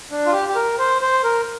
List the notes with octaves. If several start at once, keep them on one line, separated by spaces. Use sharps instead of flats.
D4
F4
G4
G4
A#4
C5
C5
A#4